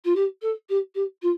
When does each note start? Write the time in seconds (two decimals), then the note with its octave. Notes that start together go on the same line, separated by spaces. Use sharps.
0.04 F4
0.15 G4
0.42 A4
0.69 G4
0.95 G4
1.22 F4